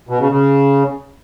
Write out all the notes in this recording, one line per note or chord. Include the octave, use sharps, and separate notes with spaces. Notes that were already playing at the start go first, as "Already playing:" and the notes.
B2
C#3
C#3